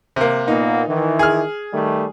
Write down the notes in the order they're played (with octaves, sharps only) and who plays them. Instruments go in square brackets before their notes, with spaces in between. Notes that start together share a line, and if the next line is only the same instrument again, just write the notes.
[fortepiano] C3 A#3
[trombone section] A#2 A#3 B3 [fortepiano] D#4
[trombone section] D#3 E3
[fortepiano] G#4 F6
[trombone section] D#3 G3 A3